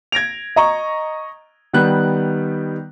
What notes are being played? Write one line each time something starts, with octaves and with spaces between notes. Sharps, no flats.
G#6 A#6 D7 F7
D#5 A#5 C#6
D#3 G3 B3 F#6